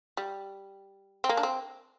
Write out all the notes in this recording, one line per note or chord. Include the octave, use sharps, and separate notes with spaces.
G3
C4
A#3
D4
C4